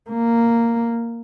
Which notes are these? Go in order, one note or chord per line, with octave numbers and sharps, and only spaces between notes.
A#3